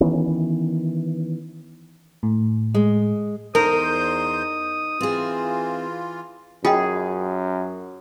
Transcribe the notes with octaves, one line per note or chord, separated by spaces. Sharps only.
D#3 E3 B3 C#4
A2
G#3
E2 D#4 A#4 C5 D#6 G6
E3 C4 F4 G#4
F#2 F4 G#4 D#5 G5